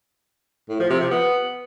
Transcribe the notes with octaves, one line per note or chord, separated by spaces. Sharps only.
A2
F3
C3
F3
B3